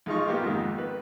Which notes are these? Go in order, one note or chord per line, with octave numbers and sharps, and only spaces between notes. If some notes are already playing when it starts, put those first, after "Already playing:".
B1 G#3 D#4 F4 C#6
A#3 B3 F4 G4
F2 G#2 D#3
B4